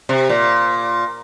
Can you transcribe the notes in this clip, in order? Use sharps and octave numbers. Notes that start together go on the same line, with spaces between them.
C3
A#2